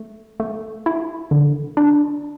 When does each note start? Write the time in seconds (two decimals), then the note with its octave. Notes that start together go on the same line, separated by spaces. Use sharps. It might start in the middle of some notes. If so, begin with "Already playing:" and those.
Already playing: A3
0.40 A3
0.86 E4
1.31 D3
1.77 D4